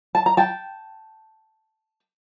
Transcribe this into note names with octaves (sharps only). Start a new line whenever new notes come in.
A5
A#5
G5 A5